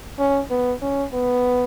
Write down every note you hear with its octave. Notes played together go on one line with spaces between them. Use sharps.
C#4
B3
C#4
B3